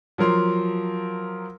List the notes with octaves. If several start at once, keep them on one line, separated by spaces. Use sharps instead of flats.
F3 F#3 A#4 C6